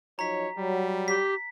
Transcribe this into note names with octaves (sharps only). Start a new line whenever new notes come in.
F3 F#3 D#4 C#5 A#5 B6
F#3 G3
G4 B6